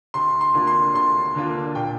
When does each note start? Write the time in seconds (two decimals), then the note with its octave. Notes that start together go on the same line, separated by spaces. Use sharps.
0.14 D2 C6
0.41 C6
0.54 D3 A#3 D4 F4
0.67 C6
0.94 D2 C6
1.35 D3 A#3 D4 F4
1.75 A#2 G5